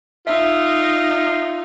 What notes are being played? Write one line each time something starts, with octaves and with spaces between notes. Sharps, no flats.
D#4 F4 E5 E6